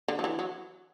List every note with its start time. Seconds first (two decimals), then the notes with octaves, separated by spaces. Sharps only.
0.08 D3
0.19 F#3
0.24 E3
0.39 F#3